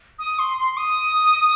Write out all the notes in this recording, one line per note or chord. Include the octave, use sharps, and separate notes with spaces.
D#6
C6
C6
D#6